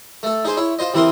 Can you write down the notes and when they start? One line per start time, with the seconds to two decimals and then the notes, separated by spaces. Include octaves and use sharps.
0.23 A3 A4
0.45 D#4 G#4 C5
0.57 E4 C#5
0.79 F4 C5 D#5
0.94 C3 E3 E4 A#4 C6 D#6